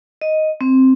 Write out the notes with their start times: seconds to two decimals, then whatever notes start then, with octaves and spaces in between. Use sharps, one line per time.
0.21 D#5
0.61 C4